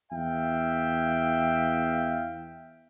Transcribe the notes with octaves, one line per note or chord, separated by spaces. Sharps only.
E2 E5 F5 G5